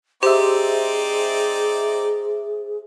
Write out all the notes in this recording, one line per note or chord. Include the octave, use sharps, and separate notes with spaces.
C4 D#4 G4 G#4 C5 D5 E5